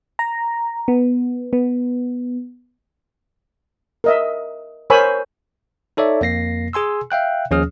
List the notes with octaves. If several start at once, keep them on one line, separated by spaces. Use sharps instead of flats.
A#5
B3
B3
A#4 D#5 E5
A#4 C5 C#5 G#5 B5 E6
D#4 A4 C#5 D5 E5
F2 A#3 A#6 C7
G#4 G#5 C6 E6
E5 F5 G5 F#6
D#2 F3 C#4 G#4 D#6 F6